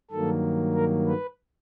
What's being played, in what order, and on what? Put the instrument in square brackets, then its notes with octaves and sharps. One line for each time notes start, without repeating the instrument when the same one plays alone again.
[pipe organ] G2 D#3 F#3 A#3 A4
A#4
B4